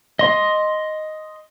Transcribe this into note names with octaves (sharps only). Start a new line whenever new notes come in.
D#5 C6